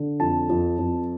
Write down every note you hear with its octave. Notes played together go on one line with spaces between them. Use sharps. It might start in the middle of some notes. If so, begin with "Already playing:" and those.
Already playing: D3
F2 A5
F2
F2